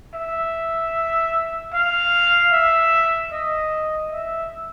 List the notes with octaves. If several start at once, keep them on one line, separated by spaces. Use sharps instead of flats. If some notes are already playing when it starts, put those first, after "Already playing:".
E5
F5
E5
D#5
E5